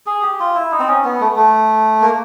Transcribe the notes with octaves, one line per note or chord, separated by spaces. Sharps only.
G#4
G4
F4
E4
D#4
C4
C#4
B3
A3
A3
A#3